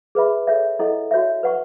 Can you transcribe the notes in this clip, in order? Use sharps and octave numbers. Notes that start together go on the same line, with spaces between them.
G#4 B4 E5 B5
A4 C#5 E5
E4 A4 D#5 F#5
F#4 C#5 E5
B4 F#5 C#6